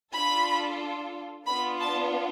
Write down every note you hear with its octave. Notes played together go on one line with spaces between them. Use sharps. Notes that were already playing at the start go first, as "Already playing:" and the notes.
D4 F4 A4 B5
B3 D4 F4 B5
A5